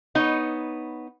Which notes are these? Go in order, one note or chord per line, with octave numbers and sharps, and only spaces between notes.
B3 D#4 C#5